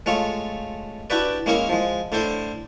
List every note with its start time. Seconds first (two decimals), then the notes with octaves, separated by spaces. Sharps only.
0.06 G#3 A3 F4 C#5
1.10 D4 E4 F#4 G4 B4 D5
1.46 G#3 A#3 C#4 E4 A#4 C#5
1.69 F3 G#3
2.12 A2 D3 E4 C5 C6